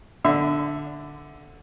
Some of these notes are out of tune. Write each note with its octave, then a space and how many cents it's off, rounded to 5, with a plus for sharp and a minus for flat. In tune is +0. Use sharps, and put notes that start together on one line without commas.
D3 +0 E5 +0 B5 +45